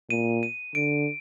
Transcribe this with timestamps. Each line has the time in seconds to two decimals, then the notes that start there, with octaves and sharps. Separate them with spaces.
0.10 A#2 D#7
0.43 D#7
0.75 D3 D7